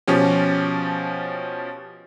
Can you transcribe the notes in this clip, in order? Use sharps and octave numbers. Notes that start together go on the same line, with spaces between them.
B2 F3 C#4 G4